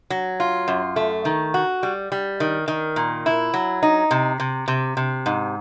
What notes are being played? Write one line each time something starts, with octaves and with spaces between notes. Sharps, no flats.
F#3
F4
F#2
A3
D#3
F#4
G3
G3
D#3
D#3
A#2
E4
F#3
D#4
C3
C3
C3
C3
G#2